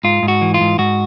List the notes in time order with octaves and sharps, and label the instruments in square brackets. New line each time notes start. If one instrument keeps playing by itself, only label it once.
[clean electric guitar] G#2 F4
G#2
F#4
E3
F4
G#2
G#2 F#4